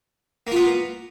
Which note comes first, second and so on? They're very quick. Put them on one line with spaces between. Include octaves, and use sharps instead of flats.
A#3 F4 B3